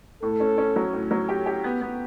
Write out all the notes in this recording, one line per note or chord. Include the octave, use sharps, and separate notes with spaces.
A2 A4
C#4
C#4
F#3
A2
F#3
G4
G4
B3
B3